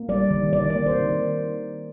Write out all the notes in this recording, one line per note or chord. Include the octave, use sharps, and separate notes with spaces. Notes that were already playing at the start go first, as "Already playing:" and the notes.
Already playing: A#3
G3 D5
D#3
D#3 D5
D5
A#3
C5
D#3